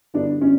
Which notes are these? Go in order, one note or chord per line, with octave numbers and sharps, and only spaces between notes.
G2 D3 G3 B3 D4
C#4